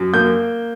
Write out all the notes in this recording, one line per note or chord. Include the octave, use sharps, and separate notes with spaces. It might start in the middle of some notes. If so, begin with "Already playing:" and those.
Already playing: F#2
A#3 G6